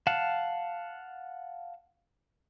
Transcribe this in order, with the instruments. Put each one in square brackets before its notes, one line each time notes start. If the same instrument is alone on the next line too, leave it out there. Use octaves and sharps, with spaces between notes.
[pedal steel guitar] F5 F#5 A5